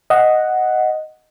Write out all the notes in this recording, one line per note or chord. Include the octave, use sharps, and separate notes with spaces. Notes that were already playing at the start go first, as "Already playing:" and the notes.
D#5 F#5